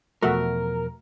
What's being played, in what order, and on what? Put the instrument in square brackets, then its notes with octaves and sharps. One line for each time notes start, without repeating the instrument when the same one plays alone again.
[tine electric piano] E2 B2 F3 [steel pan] A3 F#4 E5 [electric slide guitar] A#4